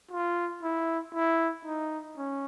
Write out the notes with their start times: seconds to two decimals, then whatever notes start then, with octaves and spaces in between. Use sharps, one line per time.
0.11 F4
0.63 E4
1.14 E4
1.65 D#4
2.17 C#4